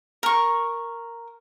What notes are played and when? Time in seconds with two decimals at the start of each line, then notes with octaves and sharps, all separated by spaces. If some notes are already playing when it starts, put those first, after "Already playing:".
0.23 A#4 C#6